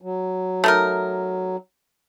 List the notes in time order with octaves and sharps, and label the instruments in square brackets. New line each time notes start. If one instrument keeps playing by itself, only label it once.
[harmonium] F#3
[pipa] A3 D#4 A#4